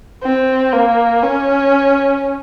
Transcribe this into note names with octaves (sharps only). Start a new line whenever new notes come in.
C4
A#3
C#4